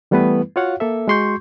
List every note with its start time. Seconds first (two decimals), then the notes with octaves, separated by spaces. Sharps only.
0.11 E3 G3 A3 B3 E4 B4
0.56 F4 F#4 C#5 F5 F#5
0.80 A#3 A4 E5
1.08 G#3 F#4 C6 C#6 G6